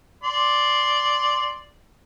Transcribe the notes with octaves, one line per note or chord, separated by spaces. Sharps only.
D5 C6